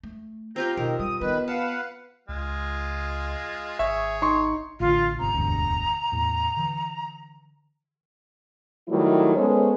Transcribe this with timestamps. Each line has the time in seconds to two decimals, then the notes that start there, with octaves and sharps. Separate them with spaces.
0.04 A3
0.56 C4 F4 G4 A#5 G6
0.77 B2 D#3 A#4
0.99 G3 D#6
1.21 D#3 B3 B4
1.48 B4 F5 F#5 A5
2.29 C#2 G#3 F4
3.79 G#1 G#4 C#5 E5
4.22 D#4 C6 C#6
4.80 A1 D3 F4
5.20 G1 C3 A#5
5.34 E1 D2 G2
6.12 E2 A2
6.57 D3 E3
8.88 D#3 F#3 G3 A3 E4
9.36 G#3 B3 C#4 A4 C5 C#5